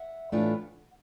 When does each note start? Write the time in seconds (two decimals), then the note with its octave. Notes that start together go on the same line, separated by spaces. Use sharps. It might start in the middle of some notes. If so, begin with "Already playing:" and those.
Already playing: E5 F#5
0.32 A2 E3 A3 D4 F4